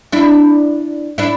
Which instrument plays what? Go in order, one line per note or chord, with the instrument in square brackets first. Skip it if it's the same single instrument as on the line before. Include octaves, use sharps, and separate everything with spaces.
[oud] D4 E4
D4 E4